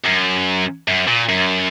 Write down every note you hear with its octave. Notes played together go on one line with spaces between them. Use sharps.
F#2
F#2
A#2
F#2